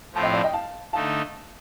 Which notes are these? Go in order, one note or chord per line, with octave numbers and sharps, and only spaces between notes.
A2 F3 C4 F4 A5
D#5 G5
D5 F5
D#5 G5
F5 A5
D3 A3 D#4 F5 A5